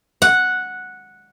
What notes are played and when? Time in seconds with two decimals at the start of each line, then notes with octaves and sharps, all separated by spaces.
0.22 F#5